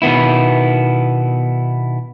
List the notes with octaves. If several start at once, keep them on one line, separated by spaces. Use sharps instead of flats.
B2 D#3 B3 E4